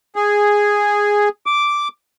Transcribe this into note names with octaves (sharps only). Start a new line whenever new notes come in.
G#4
D6